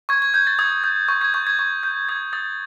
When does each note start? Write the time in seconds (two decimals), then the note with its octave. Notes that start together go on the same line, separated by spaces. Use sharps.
0.09 C#6 G#6
0.22 G#6
0.34 G6 G#6
0.47 A6
0.59 D#6 G#6
0.84 D#6 G6
1.08 C#6 G6
1.21 G#6
1.34 C#6 G6
1.47 G#6
1.59 C#6 G#6
1.83 G6
2.09 D#6 G#6
2.33 D#6 A6